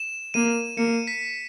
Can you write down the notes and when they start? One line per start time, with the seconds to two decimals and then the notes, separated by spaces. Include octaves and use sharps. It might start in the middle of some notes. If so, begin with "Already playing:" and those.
Already playing: E7
0.34 A#3 D#7
0.77 A#3 C#7
1.07 B6